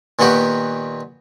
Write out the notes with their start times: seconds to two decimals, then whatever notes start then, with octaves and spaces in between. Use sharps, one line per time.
0.19 A#2 D#3 B3 F#4 G4